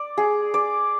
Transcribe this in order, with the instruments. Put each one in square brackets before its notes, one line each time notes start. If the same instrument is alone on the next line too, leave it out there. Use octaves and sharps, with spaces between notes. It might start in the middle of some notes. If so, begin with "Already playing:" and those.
Already playing: [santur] D5
G#4
D5